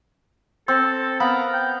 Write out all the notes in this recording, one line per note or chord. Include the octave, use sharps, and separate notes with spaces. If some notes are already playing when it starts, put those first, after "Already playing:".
C4 A4
B3 A#4 F5 B5
G5